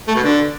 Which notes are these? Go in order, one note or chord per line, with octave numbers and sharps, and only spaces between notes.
A3
B2
D3